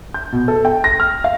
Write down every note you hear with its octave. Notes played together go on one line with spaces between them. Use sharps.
G6
B2
A4
G5
A#6
F6
F5